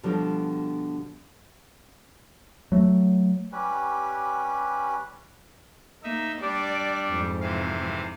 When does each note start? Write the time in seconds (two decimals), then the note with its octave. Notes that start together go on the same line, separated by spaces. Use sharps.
0.03 B2 D3 F3 G3
2.72 F#3 A3
3.52 G3 C#4 G4 B4
6.03 A#3 D#4 E5
6.41 G3 D4 D5
7.09 F2 G#2
7.41 C3 E3 F5